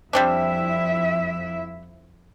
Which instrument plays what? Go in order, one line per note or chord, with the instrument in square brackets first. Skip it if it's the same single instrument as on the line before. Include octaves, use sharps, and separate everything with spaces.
[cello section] F2 E4 E5 [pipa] G3 C4 D4